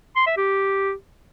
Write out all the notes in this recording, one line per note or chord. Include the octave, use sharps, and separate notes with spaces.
C6
E5
G4